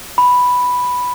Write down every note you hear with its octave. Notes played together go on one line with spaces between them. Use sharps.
B5